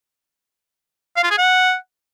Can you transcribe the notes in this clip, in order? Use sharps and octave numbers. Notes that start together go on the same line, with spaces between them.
F5
F4
G#4
F#5